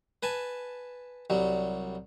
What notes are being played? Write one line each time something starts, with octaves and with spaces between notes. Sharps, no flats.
B4 G#5 A5
C2 F#3 G3